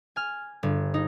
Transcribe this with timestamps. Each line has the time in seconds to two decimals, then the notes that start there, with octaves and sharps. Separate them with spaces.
0.16 G#5 F6
0.63 G1
0.94 D#4